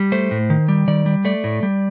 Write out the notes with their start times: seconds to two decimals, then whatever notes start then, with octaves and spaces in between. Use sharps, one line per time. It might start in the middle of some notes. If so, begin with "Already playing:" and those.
Already playing: G3
0.12 A3 C5
0.31 A2
0.50 D#3
0.69 G3
0.88 D#3 D5
1.06 G3
1.25 A3 D5
1.44 A2
1.63 G3